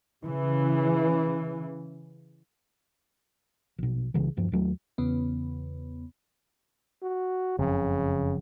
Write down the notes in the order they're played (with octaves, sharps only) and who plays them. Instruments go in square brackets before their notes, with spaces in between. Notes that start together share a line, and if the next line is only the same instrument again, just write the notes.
[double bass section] C#3 E3
[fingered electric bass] A#1 B2
C2 C#3 E3
D1 G2 F3
D#2 F#3 A3
[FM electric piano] E2 C#3 B3
[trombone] F#4
[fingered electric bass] F#1 F2 [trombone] C#3